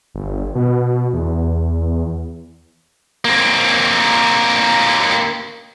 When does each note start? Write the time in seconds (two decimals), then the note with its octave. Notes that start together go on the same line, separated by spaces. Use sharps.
0.15 G1
0.55 B2
1.13 E2
3.25 A#3 C4